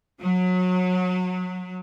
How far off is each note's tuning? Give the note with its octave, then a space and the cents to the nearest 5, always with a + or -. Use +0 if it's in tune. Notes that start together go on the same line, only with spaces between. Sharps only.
F#3 -25